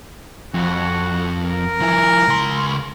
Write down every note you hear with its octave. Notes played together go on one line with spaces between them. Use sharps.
F2 F#4
A#4
F3 E4
C#2 C6